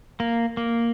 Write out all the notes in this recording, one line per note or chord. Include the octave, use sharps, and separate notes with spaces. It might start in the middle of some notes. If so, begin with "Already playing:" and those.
A#3
A#3